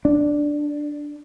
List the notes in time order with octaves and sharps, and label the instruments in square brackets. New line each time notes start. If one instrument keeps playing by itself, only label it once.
[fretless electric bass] D4